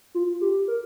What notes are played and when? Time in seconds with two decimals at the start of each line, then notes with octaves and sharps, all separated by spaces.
0.15 F4
0.41 G4
0.68 A#4